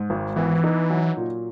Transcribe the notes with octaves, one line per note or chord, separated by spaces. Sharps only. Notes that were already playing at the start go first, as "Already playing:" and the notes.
Already playing: G#2
G#1
E3 B3
D#4
F#3
A#2